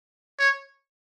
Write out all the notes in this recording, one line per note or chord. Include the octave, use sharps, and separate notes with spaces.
C#5